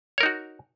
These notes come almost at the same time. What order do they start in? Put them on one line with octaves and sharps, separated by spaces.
C#5 A#4 D#4 F#4